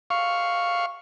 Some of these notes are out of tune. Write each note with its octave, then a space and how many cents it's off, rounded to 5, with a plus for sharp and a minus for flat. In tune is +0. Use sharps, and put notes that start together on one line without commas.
F5 +0 C#6 +0